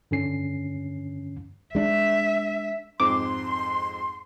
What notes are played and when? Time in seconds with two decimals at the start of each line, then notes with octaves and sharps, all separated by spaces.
0.11 G2 D3 C#4 C7
1.75 G#3 D4 E5
3.00 F2 G#2 C4 C6 D6